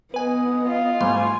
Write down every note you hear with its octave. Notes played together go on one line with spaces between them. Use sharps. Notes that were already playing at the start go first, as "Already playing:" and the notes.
B3 B4 D#5 G#5
F4
G#2 G3 A3 G#5 C6